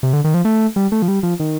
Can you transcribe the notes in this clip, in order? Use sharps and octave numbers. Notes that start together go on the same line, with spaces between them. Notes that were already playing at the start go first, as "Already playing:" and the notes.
C3
D3
D#3
F3
A3
G3
A3
F3
G3
F3
D#3